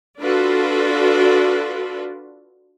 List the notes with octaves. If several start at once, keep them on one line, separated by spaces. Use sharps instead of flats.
D4 F4 F#4 A4 B4